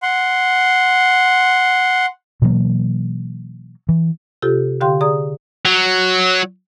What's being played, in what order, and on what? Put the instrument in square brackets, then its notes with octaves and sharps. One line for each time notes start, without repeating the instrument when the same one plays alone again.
[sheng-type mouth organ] F#5 C6
[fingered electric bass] B2 E3 F#3 A#3
E3
[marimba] C3 F4 G4 A4
D3 G4 F5 G5 C6
G#4 D5 A#5 D#6
[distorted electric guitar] F#3